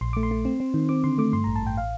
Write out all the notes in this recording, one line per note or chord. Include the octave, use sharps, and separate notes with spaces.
A#1 C6
A3 D6
C6
A3
C4
C4
D#3
C4 D6
D3 C6
A3 D6
G2 C6
A1 A#5
A5
A1 G5
F5